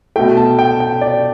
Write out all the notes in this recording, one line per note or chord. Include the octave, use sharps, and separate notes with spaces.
B2 A3 G5
A5
G5
G5
D5